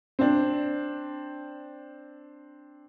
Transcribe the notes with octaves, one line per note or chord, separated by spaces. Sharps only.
C4 D4